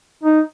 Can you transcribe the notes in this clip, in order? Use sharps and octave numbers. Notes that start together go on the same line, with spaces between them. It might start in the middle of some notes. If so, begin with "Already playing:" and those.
D#4